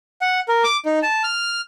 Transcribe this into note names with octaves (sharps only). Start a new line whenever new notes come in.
F#5
A#4
D6
D#4
A5
F6